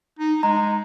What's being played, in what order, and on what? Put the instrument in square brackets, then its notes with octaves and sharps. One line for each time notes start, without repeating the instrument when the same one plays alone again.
[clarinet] D#4
[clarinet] G#3 [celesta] A#5